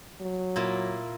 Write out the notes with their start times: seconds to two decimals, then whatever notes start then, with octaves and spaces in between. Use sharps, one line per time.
0.21 F#3
0.56 A#2 A#3 E4